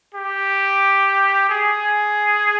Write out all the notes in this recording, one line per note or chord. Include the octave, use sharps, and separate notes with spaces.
G4
G#4